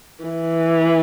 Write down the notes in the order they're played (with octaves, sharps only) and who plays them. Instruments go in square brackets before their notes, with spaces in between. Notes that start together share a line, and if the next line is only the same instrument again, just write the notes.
[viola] E3